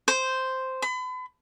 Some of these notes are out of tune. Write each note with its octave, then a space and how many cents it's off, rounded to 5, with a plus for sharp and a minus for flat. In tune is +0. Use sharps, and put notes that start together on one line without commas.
C5 -5
B5 +40